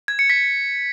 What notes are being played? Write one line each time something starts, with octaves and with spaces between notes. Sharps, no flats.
G#6
C#7
B6